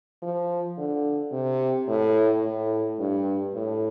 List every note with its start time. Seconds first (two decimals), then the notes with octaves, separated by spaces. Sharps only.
0.22 F3
0.78 D3
1.32 C3
1.88 A2
2.43 A2
2.99 G2
3.55 A2